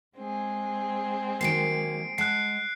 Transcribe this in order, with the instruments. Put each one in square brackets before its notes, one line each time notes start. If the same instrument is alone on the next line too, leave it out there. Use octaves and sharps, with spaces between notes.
[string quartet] G#3 C4 G#4
[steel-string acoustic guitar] D#3 F#3 A#3 [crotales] C7 D7
[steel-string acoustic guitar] G#3 F#5 A5 [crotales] F#6 C7